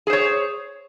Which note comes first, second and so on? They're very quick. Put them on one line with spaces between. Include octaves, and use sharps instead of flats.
G#4 C5 C#5